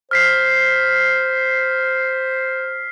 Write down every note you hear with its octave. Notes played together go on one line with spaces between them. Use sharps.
C5 F6 B6 C7